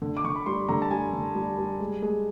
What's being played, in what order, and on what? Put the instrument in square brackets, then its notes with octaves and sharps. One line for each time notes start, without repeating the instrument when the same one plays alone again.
[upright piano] D3
D6
D3 C#6
B5
G3 C6
D3 A#5
A5
G3 G#5
D3
G3
G3
G#3
G#3